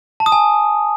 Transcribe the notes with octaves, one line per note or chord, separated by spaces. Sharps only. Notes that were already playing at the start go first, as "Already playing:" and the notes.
A5
D#6
G#5